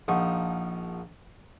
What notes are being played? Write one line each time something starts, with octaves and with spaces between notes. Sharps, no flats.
A#1 F3 D#4 F#5 C#6